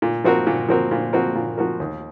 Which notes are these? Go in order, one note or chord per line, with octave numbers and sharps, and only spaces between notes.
A#2
F3 C4 F#4 A#4
A#2
F3 C4 F#4 A#4
A#2
F3 C4 F#4 A#4
A#2
F3 C4 F#4 A#4
D#2